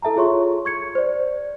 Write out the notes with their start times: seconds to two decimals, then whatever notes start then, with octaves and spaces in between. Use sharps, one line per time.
0.02 E4 A4 E5 A5 A#5
0.16 F4 G#4 C#5 C6 C#6
0.65 C#6 G#6 C#7
0.95 C5 D5